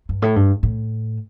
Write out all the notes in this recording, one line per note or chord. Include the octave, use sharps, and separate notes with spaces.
G2
A2
G2
A2